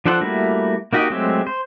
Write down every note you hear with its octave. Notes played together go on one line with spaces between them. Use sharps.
F3 D4 A4 C5 F#5
G3 A3 A#3 E4 F#4
A#3 D#4 F#4 G4 D#5
F#3 G#3 A3 C4 G4
C5